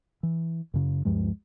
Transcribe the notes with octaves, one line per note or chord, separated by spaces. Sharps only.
E3
F#2 C#3
D2 G2 F3 G#3